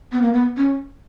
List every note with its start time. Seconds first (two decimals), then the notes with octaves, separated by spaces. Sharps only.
0.12 B3
0.22 A#3
0.33 B3
0.57 C#4